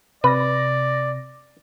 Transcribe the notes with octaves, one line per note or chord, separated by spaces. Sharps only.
C3 B4 D5 A#6